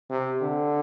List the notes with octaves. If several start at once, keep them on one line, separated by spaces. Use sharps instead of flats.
C3
D3